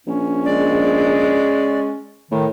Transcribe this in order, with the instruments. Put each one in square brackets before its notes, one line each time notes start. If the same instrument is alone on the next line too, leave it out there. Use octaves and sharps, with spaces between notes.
[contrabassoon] A#1 [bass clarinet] C#4
[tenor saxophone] G#3 [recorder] D5
[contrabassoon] A2 [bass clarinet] D#3